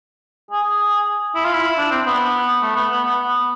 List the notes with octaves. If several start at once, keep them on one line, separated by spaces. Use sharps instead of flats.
G#4
E4
F4
E4
D4
C4
B3
A3
B3
B3
B3